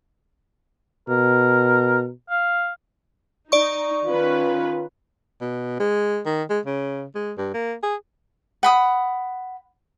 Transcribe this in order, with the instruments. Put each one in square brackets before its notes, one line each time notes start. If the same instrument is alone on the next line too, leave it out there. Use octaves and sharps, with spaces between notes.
[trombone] B2 [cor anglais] A#4
[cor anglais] F5
[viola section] D#4 [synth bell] D5 C#6
[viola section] D#3 C#4 B4 [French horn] F4
[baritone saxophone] B2
G#3
D#3
G#3
C#3
G#3
G2
A#3
G#4
[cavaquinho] F#5 B5 D#6